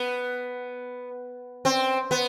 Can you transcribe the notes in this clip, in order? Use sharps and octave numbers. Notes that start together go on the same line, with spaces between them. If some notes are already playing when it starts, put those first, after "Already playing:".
Already playing: B3
C4
B3